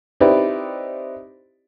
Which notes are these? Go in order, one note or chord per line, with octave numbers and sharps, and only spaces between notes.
C4 D#4 E4 G4 B4 D5